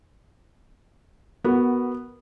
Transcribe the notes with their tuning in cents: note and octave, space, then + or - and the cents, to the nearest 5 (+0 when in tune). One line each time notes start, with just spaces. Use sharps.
B3 -5 F#4 +10 A#4 +0